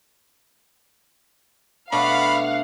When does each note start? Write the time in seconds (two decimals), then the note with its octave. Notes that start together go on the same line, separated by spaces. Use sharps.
1.92 B2 A3 D4 F5 F#5 B5